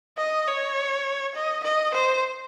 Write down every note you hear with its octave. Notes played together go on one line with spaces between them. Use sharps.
D#5
C#5
D#5
D#5
C5